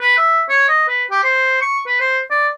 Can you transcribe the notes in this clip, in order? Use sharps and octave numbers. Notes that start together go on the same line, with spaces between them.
B4
E5
C#5
D#5
B4
G4
C5
C#6
B4
C5
D5